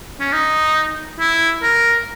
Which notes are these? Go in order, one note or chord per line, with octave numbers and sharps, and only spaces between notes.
C#4
D#4
E4
A#4